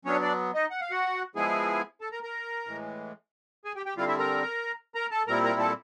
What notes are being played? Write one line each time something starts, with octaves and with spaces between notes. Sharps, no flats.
F#3 B3 C#4 D4 C#5
D4 D5
D#4 D#5
F#5
F5
F#4 F#5
F3 G#3 B3 E4 G#4 G#5
A4 A5
A#4 A#5
A#4 A#5
A2 E3 G#3
G#4 G#5
G4 G5
G4 G5
D3 G3 C4 E4 F4 F5
E4 E5
A#4 A#5
A#4 A#5
A4 A5
A#2 G3 C4 E4 A#4 A#5
A#4 A#5
A4 A5